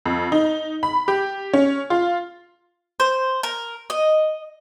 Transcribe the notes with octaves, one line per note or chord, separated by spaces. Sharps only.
F2
D#4
B5
G4
C#4
F4
C5
A#4
D#5